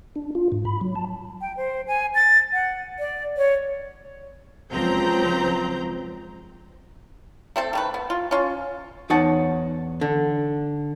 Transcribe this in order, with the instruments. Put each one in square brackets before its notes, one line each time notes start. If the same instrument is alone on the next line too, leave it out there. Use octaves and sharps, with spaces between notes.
[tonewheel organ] D4
F4
G#2
B5
F#3
A5
[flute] G5
C5
G#5
A6
F#5
D5
C#5
[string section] C#2 F3 F#3 C4 A#5 G6
[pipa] A3 C4 A4
D#3 A3 B4
B3
F4
C#4 F4
[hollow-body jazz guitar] E2 D#4 C#5 F#5 A5
D3